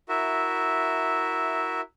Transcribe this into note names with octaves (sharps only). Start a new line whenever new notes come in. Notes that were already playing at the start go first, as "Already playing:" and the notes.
E4 F#4 A#4 E5